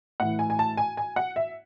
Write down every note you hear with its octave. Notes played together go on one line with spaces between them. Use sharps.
A2 E3 F#5
G#5
G#5
A5
G#5
G#5
F#5
E5